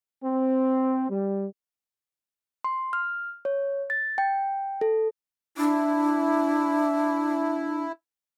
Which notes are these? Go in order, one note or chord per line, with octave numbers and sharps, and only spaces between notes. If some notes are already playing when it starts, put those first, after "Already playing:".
C4
G3
C6
F6
C#5
A6
G5
A4
D4 E4